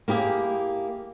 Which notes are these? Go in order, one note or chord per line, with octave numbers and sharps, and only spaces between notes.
A#3 E4 G4 G#4